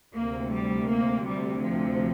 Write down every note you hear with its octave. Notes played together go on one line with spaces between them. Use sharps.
D2 C3 A#3
G3
A#3
G3
F3